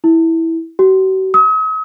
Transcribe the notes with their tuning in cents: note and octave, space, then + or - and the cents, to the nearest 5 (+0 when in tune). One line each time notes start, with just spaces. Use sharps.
E4 -10
F#4 +45
D#6 +45